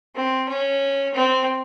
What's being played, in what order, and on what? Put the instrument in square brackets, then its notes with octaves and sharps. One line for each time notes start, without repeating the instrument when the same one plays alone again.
[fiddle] C4
C#4
C4